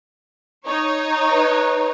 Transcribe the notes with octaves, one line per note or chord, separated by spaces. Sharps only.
D#4 C#5
B4